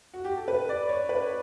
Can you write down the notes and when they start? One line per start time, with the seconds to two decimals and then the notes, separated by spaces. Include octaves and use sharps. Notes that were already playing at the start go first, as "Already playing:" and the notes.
0.13 F#4
0.25 G4
0.37 A4
0.48 B4
0.69 D5
0.89 C#5
1.09 B4